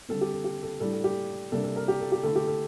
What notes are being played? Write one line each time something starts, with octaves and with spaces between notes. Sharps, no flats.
D3 G3 C4 A4
G4
A4
G4
A4
A2 G3 D4 A4
A4
G4
C3 G3 A#3 D4 A4
A4
A#4
G4
A4
G4
D3 A3 E4 A4
G4
A4